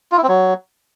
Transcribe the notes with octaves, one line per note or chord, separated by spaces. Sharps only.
F4
E4
C4
F#3